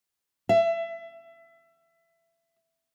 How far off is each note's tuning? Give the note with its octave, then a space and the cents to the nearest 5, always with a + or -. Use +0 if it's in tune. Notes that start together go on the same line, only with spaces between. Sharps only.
E5 +25